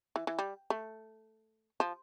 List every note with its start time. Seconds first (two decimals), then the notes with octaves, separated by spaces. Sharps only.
0.16 E3
0.27 E3
0.39 G3
0.70 A3
1.80 F3